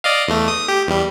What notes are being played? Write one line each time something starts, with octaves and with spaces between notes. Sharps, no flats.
D5 D#5 F5
E2 A3
D#6
G4
E2 G3